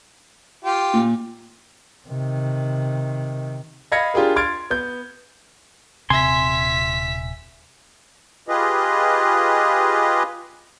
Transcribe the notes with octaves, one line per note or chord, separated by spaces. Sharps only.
F4 G4
A#2
C3 D#3
D#5 F5 B5 G#6 A#6 C#7
D4 F4 G4 G#4 A#4
C6 F6 G#6 A6 D7
B3 G6
D#1 C3 C4 E5 G#5 C6 B6
F4 G4 G#4 B4 D#5